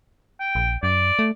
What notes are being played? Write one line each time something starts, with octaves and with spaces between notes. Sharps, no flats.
G5
A#1
F#2 D5
A3